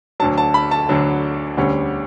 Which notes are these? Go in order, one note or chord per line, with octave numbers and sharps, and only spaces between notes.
D2 D3 F#3 A5
A5
B5
A5
D2 D3 F#3
E1 D2 D3 G3 C#4